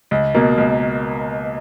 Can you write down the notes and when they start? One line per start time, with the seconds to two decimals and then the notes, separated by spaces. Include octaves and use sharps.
0.11 C#2
0.34 B2 A#3
0.58 C#2